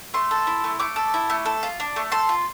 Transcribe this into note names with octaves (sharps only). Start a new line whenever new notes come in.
A3 C6
A4
E4
A3
A3 D6
A4
E4
A3
A4
F4
D4
A3
A4 C6
F4